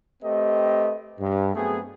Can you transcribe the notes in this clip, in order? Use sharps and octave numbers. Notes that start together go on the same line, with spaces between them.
A3 C4 G4 B4 D#5
G2
F#3 A3 B3 C4 G#4